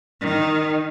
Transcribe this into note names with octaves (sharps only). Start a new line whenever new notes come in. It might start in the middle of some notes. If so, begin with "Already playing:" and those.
D#3